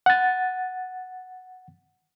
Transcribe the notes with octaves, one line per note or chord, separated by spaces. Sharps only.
F#5 A6